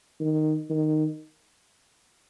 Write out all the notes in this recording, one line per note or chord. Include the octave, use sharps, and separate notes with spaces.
D#3
D#3